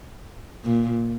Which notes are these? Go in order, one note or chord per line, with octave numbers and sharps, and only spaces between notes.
A#2